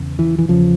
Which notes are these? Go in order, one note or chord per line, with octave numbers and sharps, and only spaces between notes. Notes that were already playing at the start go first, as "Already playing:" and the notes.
Already playing: E2 C#3
E3
E3
E2 C#3 F3